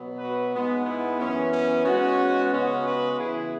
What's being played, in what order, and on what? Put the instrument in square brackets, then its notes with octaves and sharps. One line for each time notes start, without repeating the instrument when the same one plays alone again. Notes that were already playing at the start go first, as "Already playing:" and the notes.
Already playing: [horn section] B2 F#3 B3
F#4 B4
G#2 G#3 B3
B3 E4
F#2 E3 B3 C#4
C#4
G#2 G#3 B3 C#4 F#4
C#3 G#3 B3 C#4 F#4
F#4 B4
C#3 E3 B3 E4 G#4